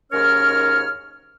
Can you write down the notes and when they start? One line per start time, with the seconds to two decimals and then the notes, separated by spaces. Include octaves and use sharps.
0.12 D#2 G#2 C#4 A#4 C#5 F6